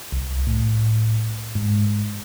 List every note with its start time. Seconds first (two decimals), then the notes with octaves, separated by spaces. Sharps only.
0.12 C2
0.47 A2
1.55 G#2